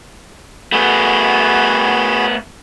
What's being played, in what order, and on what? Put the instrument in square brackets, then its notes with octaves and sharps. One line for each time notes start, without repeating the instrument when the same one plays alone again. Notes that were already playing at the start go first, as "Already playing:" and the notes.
[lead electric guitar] A3 B3 [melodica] F#4 G#4 B5